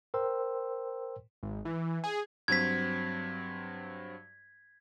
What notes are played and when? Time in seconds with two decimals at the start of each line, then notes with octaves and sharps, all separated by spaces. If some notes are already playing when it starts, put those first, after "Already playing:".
0.14 A#4 C5 G5 C6 E6
1.43 G#1
1.65 E3
2.04 G#4
2.48 G2 F#3 C4 G#6 B6